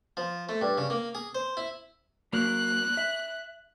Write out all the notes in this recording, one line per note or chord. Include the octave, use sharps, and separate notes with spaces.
F3
A3
G2
C#3
A#3
G#4
C5
E4
F#3 A#3 F#6
E5